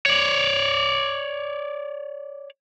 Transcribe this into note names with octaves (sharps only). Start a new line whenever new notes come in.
C#5 D5